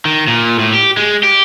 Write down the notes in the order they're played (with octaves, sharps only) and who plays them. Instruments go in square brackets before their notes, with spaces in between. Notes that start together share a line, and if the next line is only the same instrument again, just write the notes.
[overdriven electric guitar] D#3
A#2
A2
G4
G#3
G4